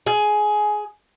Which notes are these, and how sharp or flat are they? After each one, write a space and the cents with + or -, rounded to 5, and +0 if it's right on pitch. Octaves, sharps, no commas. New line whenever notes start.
G#4 +15